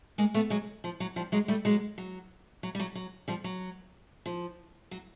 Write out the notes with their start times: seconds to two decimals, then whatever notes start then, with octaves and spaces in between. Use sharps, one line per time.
0.18 G#3 A#3
0.34 A3 B3
0.50 F#3 G#3
0.84 F3
1.00 F#3
1.16 F3 G3
1.32 F#3 G#3
1.48 G3 A3
1.65 F#3 G#3
1.98 F#3
2.63 F#3
2.75 G3
2.80 F#3
2.95 F#3
3.28 F3 G3
3.44 F#3
4.26 F3
4.91 F#3